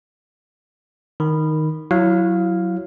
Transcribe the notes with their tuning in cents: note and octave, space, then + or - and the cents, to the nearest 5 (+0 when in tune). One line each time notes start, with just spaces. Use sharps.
D#3 +0 B5 +0
F#3 +0 E4 +20 F5 +0